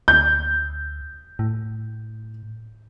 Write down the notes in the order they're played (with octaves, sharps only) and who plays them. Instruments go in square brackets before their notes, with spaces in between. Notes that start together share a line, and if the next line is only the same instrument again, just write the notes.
[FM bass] D2 [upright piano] G6
[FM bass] A2